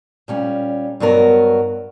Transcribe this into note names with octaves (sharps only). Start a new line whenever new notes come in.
A#2 G3 C#4
G2 F#3 B3 F#4 A#4